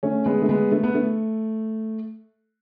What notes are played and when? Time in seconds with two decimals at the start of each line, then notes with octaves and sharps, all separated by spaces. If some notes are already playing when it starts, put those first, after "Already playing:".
0.03 A3 C#4
0.26 G#3 B3
0.42 A3
0.49 G#3 B3
0.72 A3
0.83 B3
0.95 A3